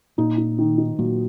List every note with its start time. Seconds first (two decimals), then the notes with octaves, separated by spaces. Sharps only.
0.18 A#2 D#4
0.38 D#4
0.59 D#3
0.78 D#4
0.99 A#2 F#3